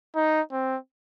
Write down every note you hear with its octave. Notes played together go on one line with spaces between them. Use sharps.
D#4
C4